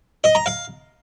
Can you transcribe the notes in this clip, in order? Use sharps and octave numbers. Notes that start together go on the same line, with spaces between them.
D#5
A#5
F5